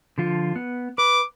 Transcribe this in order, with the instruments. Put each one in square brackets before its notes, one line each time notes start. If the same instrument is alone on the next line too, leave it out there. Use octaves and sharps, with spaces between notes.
[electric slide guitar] D3 F3 F4
B3
[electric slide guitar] B4 [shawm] D6